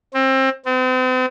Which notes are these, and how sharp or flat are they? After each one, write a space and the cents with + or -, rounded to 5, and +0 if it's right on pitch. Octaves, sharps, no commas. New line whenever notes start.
C4 +25
C4 -40